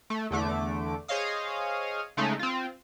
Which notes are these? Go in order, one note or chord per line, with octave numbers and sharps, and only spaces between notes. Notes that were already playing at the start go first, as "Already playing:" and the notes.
A3
E2 D3 A3 D6
G#4 C5 C#5 D#5 F5 D#6
C#3 G#3 A3 D#4
C4 F4